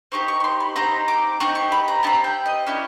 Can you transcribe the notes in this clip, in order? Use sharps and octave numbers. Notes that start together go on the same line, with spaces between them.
C4 D#4 G4 C#6
C#6
C#6
C6
B5
C4 D#4 G4 A#5
D6
C4 D#4 G4 C#6
C#6
B5
A#5
C4 D#4 G4 A5
G5
D#5
C#4 E4 G4 D5